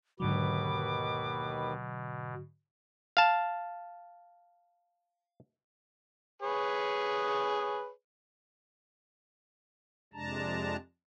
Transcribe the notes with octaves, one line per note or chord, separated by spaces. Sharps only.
D#2 G#2 B2 D3 D#3 F#3 B4 D6
F5 A5
G#4 B4 C#5
F2 C3 G#3 D4 A5 A#5